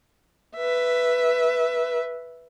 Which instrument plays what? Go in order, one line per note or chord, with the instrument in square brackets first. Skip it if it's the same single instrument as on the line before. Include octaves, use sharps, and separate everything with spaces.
[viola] B4 E5